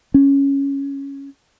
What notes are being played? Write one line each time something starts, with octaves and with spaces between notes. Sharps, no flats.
C#4